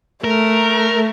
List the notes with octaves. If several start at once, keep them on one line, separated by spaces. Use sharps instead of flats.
A3 A#4